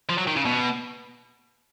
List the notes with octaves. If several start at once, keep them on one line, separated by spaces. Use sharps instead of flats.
F3
F#3
D#3
C#3
B2